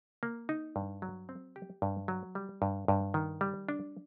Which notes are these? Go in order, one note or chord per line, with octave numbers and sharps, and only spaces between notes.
A#3
D#4
G2
F#3
C4
G4
G2
F#3
G3
G2
G2
D#3
G3
D4